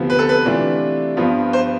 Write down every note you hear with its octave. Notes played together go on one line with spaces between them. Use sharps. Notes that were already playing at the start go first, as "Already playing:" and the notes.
Already playing: D2 C3 F3 B3
B4
A4
B4
C3 E3 A3 D4 F4
G2 F3 B3 F4
C5